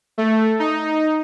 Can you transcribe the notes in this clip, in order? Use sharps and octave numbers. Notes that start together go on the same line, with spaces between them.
A3
D#4